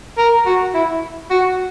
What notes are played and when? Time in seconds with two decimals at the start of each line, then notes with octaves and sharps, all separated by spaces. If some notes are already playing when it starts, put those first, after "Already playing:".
0.18 A#4
0.46 F#4
0.74 E4
1.30 F#4